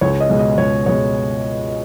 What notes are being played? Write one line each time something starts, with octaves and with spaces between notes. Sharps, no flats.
C#2 C#5
D#5
B2 G#3
D#5
C#2 C#5
B2 G#3 C#5